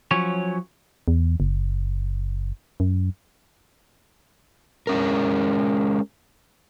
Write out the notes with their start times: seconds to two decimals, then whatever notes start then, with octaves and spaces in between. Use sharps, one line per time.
0.11 F3 F#3 C#4 C#5
1.08 E2
1.40 F#1
2.80 F#2
4.87 G#3 C#4 A#4